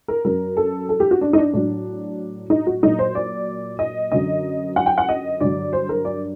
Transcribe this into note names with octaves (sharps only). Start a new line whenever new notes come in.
A#4
F#2 F#3 A#4
A4
A4
G4
F#4
D4
D#4
D4
A2 F#3 D4
D#4
F#4
A#2 F#3 D#4
C5
D5
D#5
F#2 D3 F#3 D#5
F#5
G5
F#5
D#5
G2 D3 F#3 D5
C5
A#4
D5